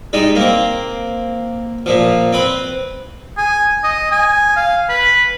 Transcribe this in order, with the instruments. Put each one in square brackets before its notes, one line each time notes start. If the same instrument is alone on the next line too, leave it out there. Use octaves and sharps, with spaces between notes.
[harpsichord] G3 G#3 D#4
A#3 C4
A#2 F3
C4 B4
[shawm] G#5
D#5
G#5
F5
B4